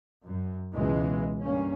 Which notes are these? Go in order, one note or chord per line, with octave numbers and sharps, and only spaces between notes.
F#2
C#2 B2 E3 G#3
G2 A#3 C#4